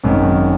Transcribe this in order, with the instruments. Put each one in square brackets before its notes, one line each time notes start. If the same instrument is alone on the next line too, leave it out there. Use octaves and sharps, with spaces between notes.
[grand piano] G#1 F#2 D#3